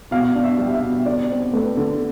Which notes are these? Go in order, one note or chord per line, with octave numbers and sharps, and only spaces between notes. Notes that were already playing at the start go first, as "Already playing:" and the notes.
B2 F5
D4
E5
G3
E5
B2
D3 D5
C4
A3 B4
D3